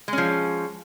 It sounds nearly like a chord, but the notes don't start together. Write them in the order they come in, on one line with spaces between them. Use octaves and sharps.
G#3 C#4 F3